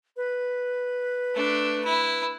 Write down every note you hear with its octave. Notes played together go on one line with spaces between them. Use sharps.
B4
A3 D4
E4